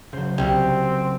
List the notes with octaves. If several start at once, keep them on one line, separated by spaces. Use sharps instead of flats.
C#3 F#3 C5
C2 C4 G4